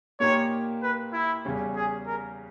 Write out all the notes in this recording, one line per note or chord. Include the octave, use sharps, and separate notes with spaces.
A#2 A#3 D#4 G4 A#4 C#5
B4
E4
E2 C#3 G3 C#4
G#4
A#4